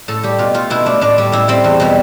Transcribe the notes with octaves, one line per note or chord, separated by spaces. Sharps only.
A2 A4
G3 G4
B2 F4
A3 F4
B2 E4
A3 D4
A2 D4
G3
A2 E4
G3 C4
E2
B2 G3